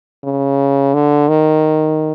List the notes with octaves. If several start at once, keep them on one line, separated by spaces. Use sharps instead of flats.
C#3
D3
D#3